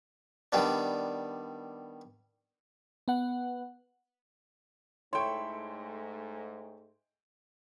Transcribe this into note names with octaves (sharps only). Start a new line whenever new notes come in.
D#3 G3 B3 D4
B3 F#5
G#2 A3 E4 A4 C#5 G5 C6 C#6